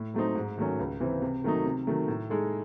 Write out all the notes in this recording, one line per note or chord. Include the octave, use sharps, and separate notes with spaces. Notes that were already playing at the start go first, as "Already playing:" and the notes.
Already playing: A2
F#3 A3 C4 D#4
G#2
D#3 F#3 A3 C#4
C#2
C3 E3 C4
C3
D#3 F#3 A3 D#4
C3
D#3 F#3 A3
A2
G#3 D#4 A4